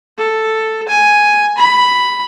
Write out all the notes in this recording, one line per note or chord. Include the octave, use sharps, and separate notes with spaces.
A4
G#5
B5